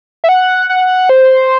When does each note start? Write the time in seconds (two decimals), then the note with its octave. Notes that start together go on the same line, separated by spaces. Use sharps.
0.24 E5
0.29 F#5
0.69 F#5
1.09 C5